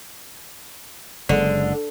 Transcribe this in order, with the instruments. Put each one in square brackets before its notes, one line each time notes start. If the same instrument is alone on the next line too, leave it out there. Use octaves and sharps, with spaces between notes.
[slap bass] F#1 G#3 [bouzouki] D3